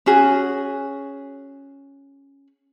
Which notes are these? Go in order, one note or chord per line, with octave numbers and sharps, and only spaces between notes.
C#4 F#4 G#4